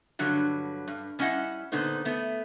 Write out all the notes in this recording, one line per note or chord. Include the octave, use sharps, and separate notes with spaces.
G2 D3 F#3 G3
G2
G3 C#4 E4 D#5 F#5
A#2 D3 B3 D#4 C5
A3 B3